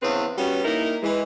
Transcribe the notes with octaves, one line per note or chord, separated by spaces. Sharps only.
E2 C#3 C4 B4
G3 B3 C#4 F#4
A#3 D#4 E4 A#4
E3 G#3